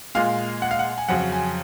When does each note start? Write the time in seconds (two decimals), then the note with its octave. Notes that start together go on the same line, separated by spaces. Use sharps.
0.15 A#2 G#3 F5
0.62 F#5
0.71 F5
0.79 F#5
0.98 G#5
1.08 F2 C#3 F#3 F#5
1.32 G#5